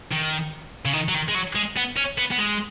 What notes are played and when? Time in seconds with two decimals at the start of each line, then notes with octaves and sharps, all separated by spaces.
0.11 D#3
0.85 C#3
0.93 D#3
1.09 F#3
1.15 D#3
1.29 G#3
1.35 F#3
1.55 G#3
1.77 B3
1.97 C#4
2.18 B3
2.31 B3
2.38 G#3